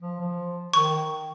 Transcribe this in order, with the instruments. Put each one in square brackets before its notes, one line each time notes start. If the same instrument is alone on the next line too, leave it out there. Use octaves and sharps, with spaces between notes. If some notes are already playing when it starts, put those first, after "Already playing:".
[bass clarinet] F3
F3
[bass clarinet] D#3 [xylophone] C#6